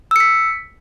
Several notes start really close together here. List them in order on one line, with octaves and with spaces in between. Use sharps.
E6 C#7 B6